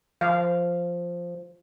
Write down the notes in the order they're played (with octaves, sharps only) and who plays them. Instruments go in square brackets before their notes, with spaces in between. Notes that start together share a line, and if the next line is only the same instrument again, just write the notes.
[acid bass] F3 [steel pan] F5